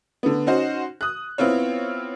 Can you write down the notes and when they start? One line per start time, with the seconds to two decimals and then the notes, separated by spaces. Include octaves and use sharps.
0.23 D3 B3
0.47 C#4 D#4 F#4 C5
1.01 D#6 F#6
1.38 B3 C4 E4 F4 C#5